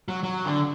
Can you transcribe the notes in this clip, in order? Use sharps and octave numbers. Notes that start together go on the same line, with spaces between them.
F#3
F#3
D3